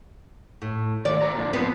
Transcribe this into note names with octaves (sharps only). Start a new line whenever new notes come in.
A2
D#3 A3 D5
C5 C#5 A#5
A#2 D3 F3
B3 C4 F4